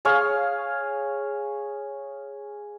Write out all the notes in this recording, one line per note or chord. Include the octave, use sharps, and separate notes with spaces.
G#4 C#5 F5